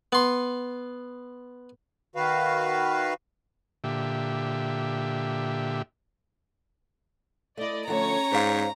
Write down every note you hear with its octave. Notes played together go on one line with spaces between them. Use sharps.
B3 C6
D#3 F#4 B4 F5
A#2 D3 G4 E5
A3 E4 D5 D#5
D3 F3 A3 C#4 C#5 A#5
G#2 C5 D5 F5